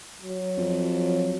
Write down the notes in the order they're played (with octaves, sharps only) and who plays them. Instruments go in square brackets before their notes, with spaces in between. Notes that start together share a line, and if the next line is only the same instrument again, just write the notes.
[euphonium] F#3
[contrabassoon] F2
[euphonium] F#3